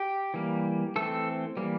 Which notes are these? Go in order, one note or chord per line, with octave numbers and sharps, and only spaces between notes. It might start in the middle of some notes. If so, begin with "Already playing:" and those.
Already playing: G4
E3 G3 A#3
E3 A3 C4 A4
E3 G3 A#3